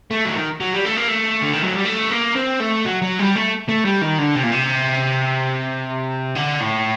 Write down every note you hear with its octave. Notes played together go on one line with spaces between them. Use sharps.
A3
F#3
D#3
F#3
G3
A3
A#3
A3
D3
D#3
F#3
G3
A3
A#3
C4
A3
F#3
F#3
G3
A3
A3
G3
D#3
D3
C3
A#2
C3
D3
A2